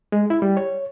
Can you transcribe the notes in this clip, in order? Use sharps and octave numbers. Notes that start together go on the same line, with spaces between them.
G#3
E4
G3
C#5